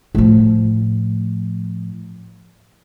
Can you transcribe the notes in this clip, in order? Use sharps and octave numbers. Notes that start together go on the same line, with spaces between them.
A2 F3